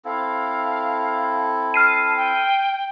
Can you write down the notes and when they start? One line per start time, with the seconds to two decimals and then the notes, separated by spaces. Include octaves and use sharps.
0.05 C4 E4 A4 F5
1.74 A5 F6 C7 D#7
2.17 G5